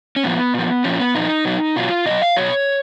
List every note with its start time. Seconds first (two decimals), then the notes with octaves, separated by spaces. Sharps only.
0.16 C#4
0.23 A#2 F3 B3
0.54 A#2 F3
0.84 A#2 F3 C#4
0.99 B3
1.15 A#2 F3 D#4
1.45 B2 F#3
1.76 B2 F#3 F4
2.06 B2 F#3 D#5
2.22 F5
2.37 B2 F#3 C#5